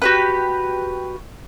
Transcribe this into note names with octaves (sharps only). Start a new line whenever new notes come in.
F#4 G4 B4